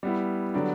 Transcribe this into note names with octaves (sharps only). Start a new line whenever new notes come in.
G3 B3 E4
D3 F#3 B3 D4 G4